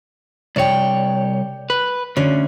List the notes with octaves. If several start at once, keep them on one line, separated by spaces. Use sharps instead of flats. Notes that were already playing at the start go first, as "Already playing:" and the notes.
C2 C#5 D5 G5
B4
D2 D3 C#4